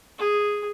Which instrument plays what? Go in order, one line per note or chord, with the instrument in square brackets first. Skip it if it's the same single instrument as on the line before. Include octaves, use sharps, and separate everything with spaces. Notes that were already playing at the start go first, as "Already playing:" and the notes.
[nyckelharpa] G#4